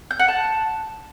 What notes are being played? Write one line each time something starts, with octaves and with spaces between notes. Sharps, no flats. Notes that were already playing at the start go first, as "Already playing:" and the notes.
G6
F#5
A5